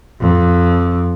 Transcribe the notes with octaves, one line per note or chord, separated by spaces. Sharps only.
F2